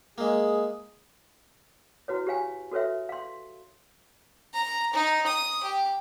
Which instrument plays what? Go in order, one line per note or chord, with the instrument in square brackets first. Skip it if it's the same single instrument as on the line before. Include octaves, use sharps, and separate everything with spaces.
[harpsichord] G#3 A#3 [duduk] G#4
[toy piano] E4 F#4 B4 C#5
G4 C#5 F5 G#5
F#4 A4 B4 C#5 E5
F5 C6
[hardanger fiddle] A#5
D#4
D#6
G4